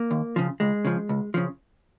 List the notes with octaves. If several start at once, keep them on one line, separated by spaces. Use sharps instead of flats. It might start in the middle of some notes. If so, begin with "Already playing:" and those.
Already playing: A#3
D#2
C#3 F3
C#2 G#3
C#3 F3
C#2
C#3 F3